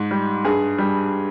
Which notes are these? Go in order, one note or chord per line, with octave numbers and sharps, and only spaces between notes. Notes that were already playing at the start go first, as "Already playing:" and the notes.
Already playing: G#2
G3
G2 G#4
G3